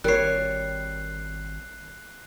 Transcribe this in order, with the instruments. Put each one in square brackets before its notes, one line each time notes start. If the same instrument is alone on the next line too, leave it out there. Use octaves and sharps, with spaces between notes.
[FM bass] G#1 [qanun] G3 C#5 [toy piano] A#4 [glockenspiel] F#6 C7